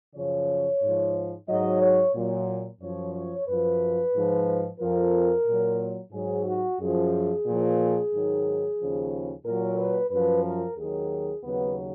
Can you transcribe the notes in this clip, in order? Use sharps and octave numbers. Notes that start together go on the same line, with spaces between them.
F#2 C#3 F3 C#5
G#2 F3
G#2 F#3 D#5
C#5
A#2 F#3
F#2 F3 C#5
C#5
F#2 F3 B4
G#2 F3
F2 F3 A#4
A#2 F#3
G#2 F#3 G#4
F#4
F#2 F3 G#4
A#2 F3
G#2 D#3 F#3
D#2 C#3 F3
A#2 F#3 A#4
B4
F#2 F3 B4
A#4
D#2 D#3 F#3 G#4
D#2 C#3 F#3 B3